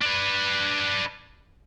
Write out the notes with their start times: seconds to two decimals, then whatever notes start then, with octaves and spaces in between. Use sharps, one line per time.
0.02 D4 B4